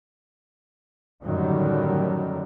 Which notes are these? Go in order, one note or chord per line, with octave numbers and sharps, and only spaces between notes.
F#2 A2 D3 D#3 F#3 G3